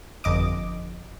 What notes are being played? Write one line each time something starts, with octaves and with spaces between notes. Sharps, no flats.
G1 F2 D#5 D6